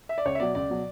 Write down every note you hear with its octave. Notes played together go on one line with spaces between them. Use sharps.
E5
D5
C#2 C#5
E5
B2 F#3 D5
C#2 D5
B2 F#3